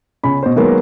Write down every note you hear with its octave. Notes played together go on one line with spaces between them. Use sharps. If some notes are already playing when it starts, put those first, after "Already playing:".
C#2 C#3 C#4 B5
B2 C5
D#3 F#3 G#3 A#3 B3 F#4